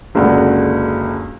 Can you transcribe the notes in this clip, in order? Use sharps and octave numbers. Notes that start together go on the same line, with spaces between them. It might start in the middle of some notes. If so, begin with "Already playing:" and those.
F#1 C#2 D3 F#4